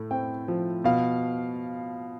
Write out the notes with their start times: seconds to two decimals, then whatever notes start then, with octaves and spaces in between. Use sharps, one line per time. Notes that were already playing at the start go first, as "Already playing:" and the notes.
Already playing: A2 A3
0.11 C4 G5
0.48 F3
0.84 B2 F5